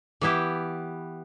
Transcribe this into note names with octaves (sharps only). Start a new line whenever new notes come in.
E3 B3 E4 G4